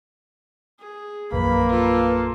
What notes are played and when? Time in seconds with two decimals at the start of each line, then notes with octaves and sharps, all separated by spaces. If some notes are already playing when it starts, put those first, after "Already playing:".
0.79 G#4
1.32 A#1 F#2 D#3 A#3 B4 B5
1.69 F4 A4